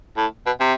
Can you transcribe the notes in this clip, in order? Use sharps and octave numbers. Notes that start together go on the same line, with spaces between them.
A2
B2
C3